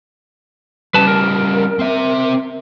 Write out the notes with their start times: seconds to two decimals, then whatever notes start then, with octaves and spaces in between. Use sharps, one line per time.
0.94 C#3 G3 B4 A5
1.07 A#4
1.79 C4 E5